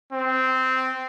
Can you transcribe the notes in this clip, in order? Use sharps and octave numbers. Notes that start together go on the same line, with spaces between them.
C4